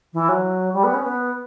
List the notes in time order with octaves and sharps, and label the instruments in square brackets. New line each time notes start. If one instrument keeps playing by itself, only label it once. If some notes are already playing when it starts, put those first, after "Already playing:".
[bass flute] E3
F#3
G3
B3
C#4
B3